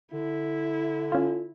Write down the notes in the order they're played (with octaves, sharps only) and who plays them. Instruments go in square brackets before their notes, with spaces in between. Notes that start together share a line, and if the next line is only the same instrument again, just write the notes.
[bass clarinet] D3 [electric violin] E4
[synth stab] C#4 F4